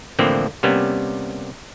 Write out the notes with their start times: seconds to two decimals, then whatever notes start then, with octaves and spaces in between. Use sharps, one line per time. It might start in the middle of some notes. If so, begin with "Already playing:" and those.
0.19 A2 D3 E3 F3 A#3 C4
0.63 C3 G3 A#3 B3 C#4